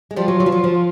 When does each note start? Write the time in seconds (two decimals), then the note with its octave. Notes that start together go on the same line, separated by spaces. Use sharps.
0.11 G#3
0.16 F3 G3 F4
0.28 F#3
0.40 F#3
0.46 F3
0.52 F#3
0.64 F3